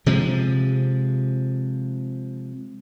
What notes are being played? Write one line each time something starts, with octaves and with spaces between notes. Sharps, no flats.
C3 F3 G#3